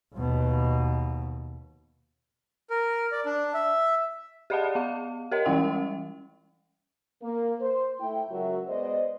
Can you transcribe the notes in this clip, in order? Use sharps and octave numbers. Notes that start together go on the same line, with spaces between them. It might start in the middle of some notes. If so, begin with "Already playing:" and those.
D#2 B2
A#4
D5
D4
E5
G4 G#4 D5 D#5 F#5 A5
B3 F5
G4 A#4 C#5 D#5
E3 G3 G#3 C#4 E5 G5
A#3
C5
A3 E4 G5
C#2 F#3 F#4 A#4 E5
G#3 B3 C5 D5 D#5